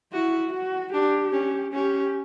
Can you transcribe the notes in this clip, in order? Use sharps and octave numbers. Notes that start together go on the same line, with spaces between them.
E4 F#4
F#4
D4 G4
C#4
C#4 G4